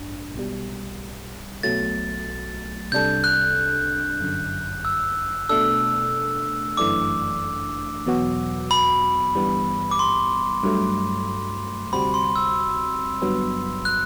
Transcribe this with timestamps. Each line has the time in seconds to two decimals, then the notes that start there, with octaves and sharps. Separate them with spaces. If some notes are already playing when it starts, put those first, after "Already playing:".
Already playing: A1 G2 D4
0.34 B1 B2 G3
1.63 B1 B2 F#3 A3 A6
2.92 C2 C3 G3 D4 A4 G6
3.24 F#6
4.20 G1 F#2 D3
4.85 E6
5.49 B2 A3 D4 A4 E6
6.77 G1 F#2 E3 A3 D4 D6
8.06 E2 B2 F#3 B3 F#4
8.71 B5
9.35 G1 G2 E3 G3 B3
9.91 D6
9.99 C6
10.63 G2 F#3 A3
11.93 D2 C3 G3 C4 F#4 B5
12.14 C6
12.36 E6
13.22 G1 G2 F#3 B3
13.85 F#6